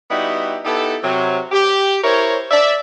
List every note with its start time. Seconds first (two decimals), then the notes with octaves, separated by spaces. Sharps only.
0.11 G3 B3 D#4 E4 F#4 G4
0.65 B3 D#4 E4 G4 A4
1.03 C3 F#3
1.52 G4
2.04 E4 A#4 C5 C#5
2.51 D5 E5